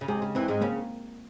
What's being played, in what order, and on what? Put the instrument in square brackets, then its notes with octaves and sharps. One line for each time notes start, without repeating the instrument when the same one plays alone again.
[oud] C#3
[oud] C3 [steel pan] G#3 G#4
[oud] C#3
[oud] E2 E3 [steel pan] C4
[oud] G#2 G#3
[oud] C#3 C#4 [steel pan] A#3